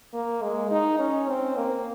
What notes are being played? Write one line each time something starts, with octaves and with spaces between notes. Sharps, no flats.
A#3
G#3
D#4
C#4
C4
A#3